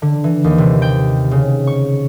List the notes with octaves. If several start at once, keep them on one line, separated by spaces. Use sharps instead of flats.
D3
E3
D#2
C3
G5
C#3
C#6